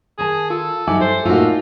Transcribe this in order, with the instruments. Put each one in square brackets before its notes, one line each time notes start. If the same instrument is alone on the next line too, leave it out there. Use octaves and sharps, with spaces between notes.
[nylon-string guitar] D#3 A5 [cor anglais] G#4
[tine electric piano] F4 [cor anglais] A4
[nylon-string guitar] G2 F#3 [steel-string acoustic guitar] D#4 F#4 [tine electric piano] E5 G#5 D6
[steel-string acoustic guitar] A4 [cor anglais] C5
[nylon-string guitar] A2 A#3 F#4 [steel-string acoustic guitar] D#4 F4 [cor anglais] A4